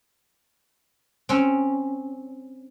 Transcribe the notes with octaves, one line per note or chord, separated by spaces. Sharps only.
C4 C#4